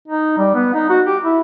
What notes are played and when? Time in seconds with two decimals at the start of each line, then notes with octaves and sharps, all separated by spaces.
0.08 D#4
0.38 G3
0.55 B3
0.74 D#4
0.90 F#4
1.06 G4
1.24 E4